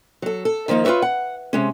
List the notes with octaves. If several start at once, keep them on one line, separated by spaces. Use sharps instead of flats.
F#3 A4
A4
D#3 F3 A#3 D4 D#4
F4 F#4 B4 C#5 E5
F#5
C3 G#3 C#4